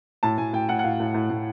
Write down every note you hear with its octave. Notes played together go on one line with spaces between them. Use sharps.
A2 A5
A2 G#5
A2 G5
A2 F#5
F#5
A2 F5
A2
A2
A2